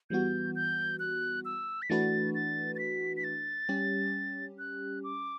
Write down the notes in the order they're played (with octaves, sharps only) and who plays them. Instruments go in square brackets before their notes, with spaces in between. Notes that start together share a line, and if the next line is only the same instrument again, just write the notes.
[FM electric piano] E3 G3 B3 F#4 [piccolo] G6
[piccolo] G6
F#6
E6
B6
[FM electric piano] E3 A3 D4 F#4 B4 [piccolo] A6
[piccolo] A6
A6
B6
B6
A6
[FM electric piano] G3 C#4 G4
[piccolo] F#6
D6